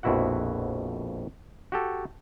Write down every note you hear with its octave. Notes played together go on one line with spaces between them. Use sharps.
A#1 F2 B2 E4 F#4 F#5
F#4 G4 A4